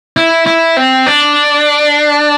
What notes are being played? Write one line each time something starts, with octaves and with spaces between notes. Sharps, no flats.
E4
E4
C4
D4